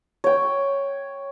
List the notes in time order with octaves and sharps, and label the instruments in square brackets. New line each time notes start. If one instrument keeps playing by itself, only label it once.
[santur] C#5 G5